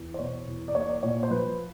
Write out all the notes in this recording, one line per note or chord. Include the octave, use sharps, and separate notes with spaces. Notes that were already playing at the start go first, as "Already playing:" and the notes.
Already playing: E2
C5
B2 C#5
E2
D5
A#3 C#5
D5
A#2 C#5
C5
F3 B4